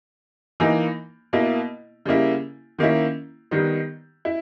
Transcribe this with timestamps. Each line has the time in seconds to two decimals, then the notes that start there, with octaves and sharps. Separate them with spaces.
0.60 E3 A#3 D#4
1.33 B2 A#3 E4
2.05 C#3 G3 A#3 E4
2.79 D#3 A#3 C#4 E4
3.51 D#3 G3 B3 D#4
4.25 E4